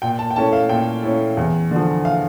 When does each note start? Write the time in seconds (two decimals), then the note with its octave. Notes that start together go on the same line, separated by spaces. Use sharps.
0.02 A#2 G5
0.19 A5
0.31 G5
0.36 A3 C#4 E4 A5
0.53 F5
0.69 A#2 G5
1.03 A3 C#4 E4
1.37 E2
1.71 D3 F3
2.05 F5